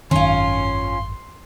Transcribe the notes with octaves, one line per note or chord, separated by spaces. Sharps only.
G#1 F#2 D#3 C#4 F4 C6